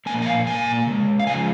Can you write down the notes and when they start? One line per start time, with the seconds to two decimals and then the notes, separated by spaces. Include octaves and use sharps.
0.06 A#2 F3 A#3 G#5
0.22 G#5
0.26 F5
0.47 A#2 A#3 G#5
0.87 C#3 G#3
1.20 F5
1.27 C#3 F3 G#3 G#5